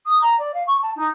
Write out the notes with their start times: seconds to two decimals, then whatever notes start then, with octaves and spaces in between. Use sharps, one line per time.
0.06 D#6
0.21 A#5
0.39 D5
0.54 F5
0.67 C#6
0.82 A5
0.96 D#4